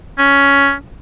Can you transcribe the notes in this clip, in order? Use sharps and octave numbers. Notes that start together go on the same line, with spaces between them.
C#4